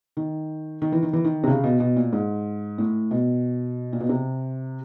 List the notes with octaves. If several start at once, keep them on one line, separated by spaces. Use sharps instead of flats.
D#3
D#3
E3
D#3
E3
D#3
C3
C#3
B2
B2
A#2
G#2
A2
B2
A#2
B2
C3